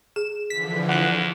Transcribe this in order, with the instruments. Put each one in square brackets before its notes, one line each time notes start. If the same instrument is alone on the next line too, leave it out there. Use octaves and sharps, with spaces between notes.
[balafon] G#4 [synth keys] E7
[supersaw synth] D3 E3 F3 [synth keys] B6
[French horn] E2 [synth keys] F#5 F#6